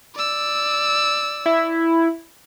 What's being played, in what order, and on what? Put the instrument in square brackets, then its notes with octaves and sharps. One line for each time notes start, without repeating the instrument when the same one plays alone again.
[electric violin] D5 E6
[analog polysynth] E4